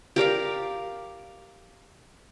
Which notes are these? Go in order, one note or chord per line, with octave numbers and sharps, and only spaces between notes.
G4 A#4 D5 F5